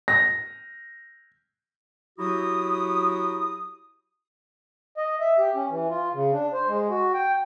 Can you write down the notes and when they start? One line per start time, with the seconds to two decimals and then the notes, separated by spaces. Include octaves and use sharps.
0.08 A#6
2.19 F#3 E4 F#4 G4 D#6
4.97 D#5
5.20 E5
5.38 G4
5.55 C#4
5.70 E3
5.90 F4
6.13 C#3
6.32 D4
6.53 C5
6.68 G#3
6.90 F#4
7.14 G5